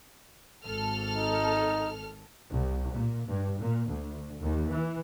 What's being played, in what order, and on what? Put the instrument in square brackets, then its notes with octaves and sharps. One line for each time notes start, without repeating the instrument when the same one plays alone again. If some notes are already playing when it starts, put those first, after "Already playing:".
[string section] G#1 A4 F6
[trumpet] D#4
[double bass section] C2
A#2
G2
A#2
D2
D#2
E3